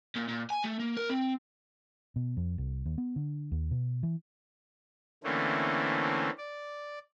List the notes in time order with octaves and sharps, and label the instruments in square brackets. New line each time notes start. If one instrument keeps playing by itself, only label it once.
[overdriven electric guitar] A#2
A#2
G#5
A3
A#3
A#4
C4
[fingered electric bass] B2
F2
C2
D#2
B3
D3
D#2
B2
E3
[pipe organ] D3 E3 A3 A#3 C4 C#4
D5